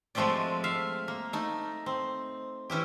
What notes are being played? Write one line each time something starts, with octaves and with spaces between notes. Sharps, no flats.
F3 G#3 A3 C4 G4 D5
E5 F5
A#3
A3 D#4
C4
E3 C#4 E4 G4